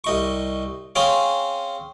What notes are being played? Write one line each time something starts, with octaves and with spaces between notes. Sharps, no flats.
C2 D#4 C#6
C4 C#4 G#4 C#5 F5